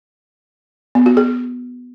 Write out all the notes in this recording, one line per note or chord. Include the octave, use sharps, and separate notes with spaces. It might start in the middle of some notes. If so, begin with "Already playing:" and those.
B3
F#4
G#4